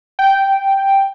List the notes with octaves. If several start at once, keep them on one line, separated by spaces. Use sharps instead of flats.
G5